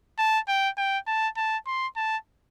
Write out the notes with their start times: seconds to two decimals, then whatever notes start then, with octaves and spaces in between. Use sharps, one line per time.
0.19 A5
0.49 G5
0.78 G5
1.07 A5
1.37 A5
1.67 C6
1.96 A5